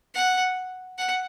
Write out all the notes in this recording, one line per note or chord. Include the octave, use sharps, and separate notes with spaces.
F#5
F#5